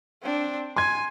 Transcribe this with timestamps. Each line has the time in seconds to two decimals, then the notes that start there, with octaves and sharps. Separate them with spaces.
0.22 C4 D4
0.76 G#5 C6 G#6